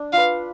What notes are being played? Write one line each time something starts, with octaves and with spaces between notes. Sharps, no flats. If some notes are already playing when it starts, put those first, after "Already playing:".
Already playing: D4
F4 B4 F5